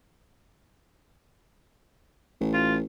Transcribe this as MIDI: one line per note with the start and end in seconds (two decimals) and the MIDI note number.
2.41 2.83 33
2.53 2.75 65